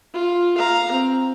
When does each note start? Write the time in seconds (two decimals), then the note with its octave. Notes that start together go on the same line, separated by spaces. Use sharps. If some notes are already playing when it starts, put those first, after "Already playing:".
0.14 F4
0.58 F5 A#5
0.92 C4